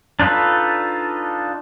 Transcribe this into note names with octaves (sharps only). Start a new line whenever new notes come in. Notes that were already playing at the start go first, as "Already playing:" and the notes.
D4 D#4 F4 A4 B4